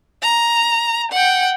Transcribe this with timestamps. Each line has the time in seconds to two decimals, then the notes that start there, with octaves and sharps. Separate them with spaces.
0.22 A#5
1.12 F#5 G5